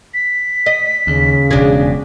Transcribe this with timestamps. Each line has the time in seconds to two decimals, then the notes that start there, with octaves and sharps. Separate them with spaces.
0.14 B6
0.66 D#5
1.07 D#2 C#3
1.51 E1 B2 D4 G#4